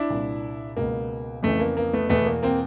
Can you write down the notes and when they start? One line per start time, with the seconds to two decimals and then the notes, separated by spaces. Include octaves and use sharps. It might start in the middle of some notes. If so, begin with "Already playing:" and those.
Already playing: D4 E4
0.10 C2 A#2
0.76 C#2 B2 A#3
1.43 F2 C#3 E3 A3
1.60 A#3
1.77 A#3
1.93 A3 B3
2.09 E2 B2 A3 B3
2.26 A#3
2.43 A#3 C4